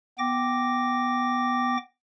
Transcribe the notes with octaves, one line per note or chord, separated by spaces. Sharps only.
B3 G5 D6 A#6